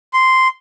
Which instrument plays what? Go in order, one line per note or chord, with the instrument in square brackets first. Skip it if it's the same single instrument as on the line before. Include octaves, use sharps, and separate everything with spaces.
[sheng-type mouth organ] C6